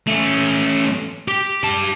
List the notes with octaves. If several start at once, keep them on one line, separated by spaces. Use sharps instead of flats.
A3 C#4
G4
G4 A5